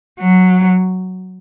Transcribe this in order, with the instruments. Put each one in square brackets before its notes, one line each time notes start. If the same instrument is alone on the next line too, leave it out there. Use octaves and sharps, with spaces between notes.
[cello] F#3